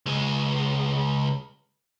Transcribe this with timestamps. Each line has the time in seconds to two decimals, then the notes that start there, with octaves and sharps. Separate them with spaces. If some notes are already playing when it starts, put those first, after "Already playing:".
0.06 C#2 G#3